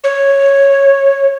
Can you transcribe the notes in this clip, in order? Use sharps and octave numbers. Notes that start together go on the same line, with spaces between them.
C#5